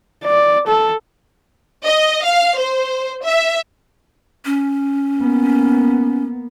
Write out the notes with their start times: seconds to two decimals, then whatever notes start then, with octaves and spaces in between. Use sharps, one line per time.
0.24 D5
0.68 A4
1.87 D#5
2.25 F5
2.60 C5
3.25 E5
4.45 C#4
5.18 A#3 B3